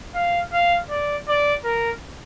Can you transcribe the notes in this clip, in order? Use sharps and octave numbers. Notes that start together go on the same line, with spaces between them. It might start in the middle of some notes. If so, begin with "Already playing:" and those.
F5
F5
D5
D5
A#4